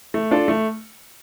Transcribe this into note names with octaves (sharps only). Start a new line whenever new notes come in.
A3
D4 F4 A4
A3